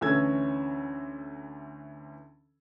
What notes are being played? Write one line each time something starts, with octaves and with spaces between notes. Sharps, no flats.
D2 E3 C#4 A4 E6 G#6